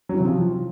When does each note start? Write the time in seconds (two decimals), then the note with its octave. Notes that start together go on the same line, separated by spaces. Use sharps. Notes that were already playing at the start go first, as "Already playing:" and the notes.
0.09 F#3
0.15 E3
0.20 C3
0.25 F3